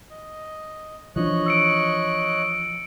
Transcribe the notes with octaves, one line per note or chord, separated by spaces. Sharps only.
D#5
E3 F3 D4 C#5 D#5 F#6
E6 C#7 D7